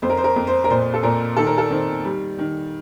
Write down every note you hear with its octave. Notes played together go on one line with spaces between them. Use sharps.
F2 C5
A#4
C5
A#4
F2
C5
A#4
A#2 C5
A4
A#2 A#4
D#3 A4
A#4
A4
D#3 C4
G3
D#3